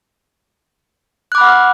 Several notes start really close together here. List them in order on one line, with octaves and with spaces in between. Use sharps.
F#6 D6 B5 F#5 F6